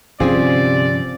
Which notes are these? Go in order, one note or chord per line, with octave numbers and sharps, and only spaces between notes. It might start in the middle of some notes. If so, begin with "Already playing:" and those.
G1 C3 F3 C4 C#4 F4 G#4 D5